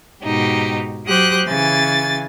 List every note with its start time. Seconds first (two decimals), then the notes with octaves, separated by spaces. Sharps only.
0.24 G#2 B2 D#4 G4
1.07 F#3 G4 C5 D#6 F#6
1.46 C#3 E3 G#5 A6